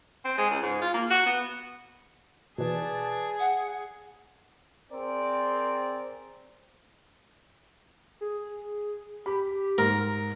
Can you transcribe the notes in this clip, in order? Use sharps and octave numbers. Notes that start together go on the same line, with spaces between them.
C4
G#3
C#2
G#2
F4
A#3
F#4
B3
B2 E3 G#4 B4 D5 A5
F#5
C4 G#4 A#4 D5
G#4
G4 B5
G#2 A#4